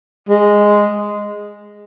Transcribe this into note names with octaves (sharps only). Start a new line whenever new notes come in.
G#3